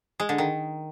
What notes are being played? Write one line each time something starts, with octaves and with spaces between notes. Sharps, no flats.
G#3
D3
D#3